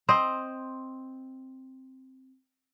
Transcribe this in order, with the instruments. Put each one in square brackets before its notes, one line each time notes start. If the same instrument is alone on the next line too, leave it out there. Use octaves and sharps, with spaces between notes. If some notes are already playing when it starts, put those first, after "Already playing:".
[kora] C4 C5 D#5